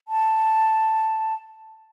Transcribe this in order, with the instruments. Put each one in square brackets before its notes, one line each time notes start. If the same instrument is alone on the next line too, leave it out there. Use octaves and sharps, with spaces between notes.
[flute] A5